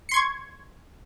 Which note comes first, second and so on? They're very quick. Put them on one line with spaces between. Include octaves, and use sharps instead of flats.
C#7 C6 G#6 C#6